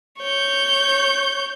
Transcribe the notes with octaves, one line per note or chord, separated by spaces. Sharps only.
C#5 G6